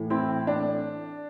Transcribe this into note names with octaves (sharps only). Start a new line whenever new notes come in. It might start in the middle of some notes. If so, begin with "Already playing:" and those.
Already playing: A2 E3
C4 E4
D4